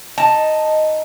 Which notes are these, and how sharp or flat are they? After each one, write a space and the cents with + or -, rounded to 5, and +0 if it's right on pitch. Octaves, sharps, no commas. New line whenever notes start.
D#4 +0 A5 +5